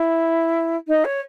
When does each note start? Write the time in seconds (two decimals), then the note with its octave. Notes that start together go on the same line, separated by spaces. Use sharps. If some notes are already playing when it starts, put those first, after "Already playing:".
Already playing: E4
0.87 D#4
1.04 C#5